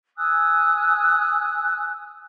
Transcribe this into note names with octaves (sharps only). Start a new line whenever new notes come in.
G#5 D#6 E6 F#6